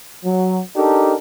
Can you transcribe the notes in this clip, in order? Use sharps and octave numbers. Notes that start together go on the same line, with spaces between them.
F#3
D4 D#4 G4 A4 A#4